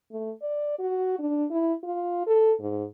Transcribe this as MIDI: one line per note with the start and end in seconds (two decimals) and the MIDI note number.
0.12 0.30 57
0.42 0.79 74
0.79 1.19 66
1.19 1.45 62
1.51 1.73 64
1.84 2.22 65
2.27 2.52 69
2.60 2.84 44